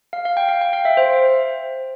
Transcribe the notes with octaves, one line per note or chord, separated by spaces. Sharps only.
F5
F5
G5
F5
G5
F5
E5
C5